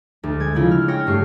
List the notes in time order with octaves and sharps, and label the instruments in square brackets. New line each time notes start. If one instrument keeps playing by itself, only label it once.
[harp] D2
G#3 G#6
C#3 F3 E4 F4
F6
C#5 G5 F6 A#6
G2 A3 C#6 C7